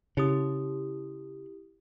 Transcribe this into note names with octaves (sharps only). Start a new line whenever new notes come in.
C#3 E4 G4 D#6